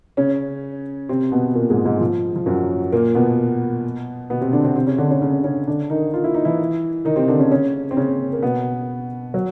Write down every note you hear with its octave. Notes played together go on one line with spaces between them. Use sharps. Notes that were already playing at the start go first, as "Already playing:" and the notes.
C#3 C#4
C3 C4
B2 B3
A#2 A#3
G#2 G#3
G#2 G#3
F3
F3
F#2 F#3
A#2 A#3
B2 B3
B2 B3
C3 C4
D3 D4
C3 C4
C3 C4
C#3 C#4
D3 D4
C#3 C#4
C#3 C#4
C#3 C#4
D3 D4
D#3 D#4
F4
E4
D#4
E3 E4
D#3 D#4
C3 C4
D3 D4
C#3 C#4
C#3 C#4
C4
C#3 C#4
A#3
B2 B3
F#3